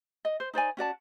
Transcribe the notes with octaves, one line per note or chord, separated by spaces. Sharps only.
D#5
C5
D#4 C5 D5 G#5
C#4 F#4 D5 A5